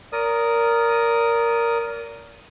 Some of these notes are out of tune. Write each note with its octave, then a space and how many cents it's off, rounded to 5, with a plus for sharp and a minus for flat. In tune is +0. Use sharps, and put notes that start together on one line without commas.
A#4 +0 D5 -35 D#6 +0